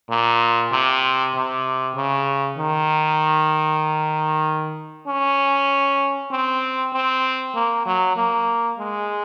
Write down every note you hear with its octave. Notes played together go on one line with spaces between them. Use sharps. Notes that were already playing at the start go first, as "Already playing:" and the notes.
A#2
C3
C3
C#3
D#3
C#4
C4
C4
A#3
F#3
A#3
G#3